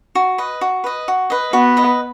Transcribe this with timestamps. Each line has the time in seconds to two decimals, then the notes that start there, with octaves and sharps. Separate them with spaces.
0.15 F#4
0.38 B4 D#5
0.61 F#4
0.84 B4 D#5
1.08 F#4
1.30 B4 D#5
1.53 B3 F#4
1.77 B4 D#5